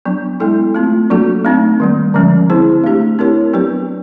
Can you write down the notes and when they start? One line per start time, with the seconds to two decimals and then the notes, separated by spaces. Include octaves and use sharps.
0.06 F#3 B3 D4
0.40 G#3 B3 E4 A4
0.75 A3 C4 F4
1.10 F#3 A#3 D4 F#4 A4
1.45 A3 C4 D#4
1.80 D#3 G3 A#3
2.14 D3 F3 G#3 C#4
2.50 C4 E4 G#4 C5
2.84 A3 D4 G4
3.19 C4 E4 G4 A#4 C#5
3.53 F#3 B3 D4 G4 B4